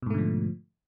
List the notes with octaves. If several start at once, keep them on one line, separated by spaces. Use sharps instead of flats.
G#2 B2 D3 F3 A3